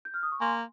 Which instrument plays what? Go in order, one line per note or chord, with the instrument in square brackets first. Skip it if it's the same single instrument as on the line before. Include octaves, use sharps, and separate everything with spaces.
[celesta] G6
F6
D#6
C#6
[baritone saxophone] A#3 [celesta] G#5 C6